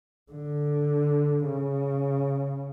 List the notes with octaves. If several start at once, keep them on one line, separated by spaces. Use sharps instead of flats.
D3
C#3